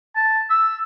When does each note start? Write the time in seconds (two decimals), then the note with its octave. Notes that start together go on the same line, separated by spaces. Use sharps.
0.16 A5
0.50 E6